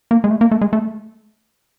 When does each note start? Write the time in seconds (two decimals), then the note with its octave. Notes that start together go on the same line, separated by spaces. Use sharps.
0.11 A#3
0.24 G#3
0.31 A3
0.41 A#3
0.51 A3
0.61 G#3
0.73 A3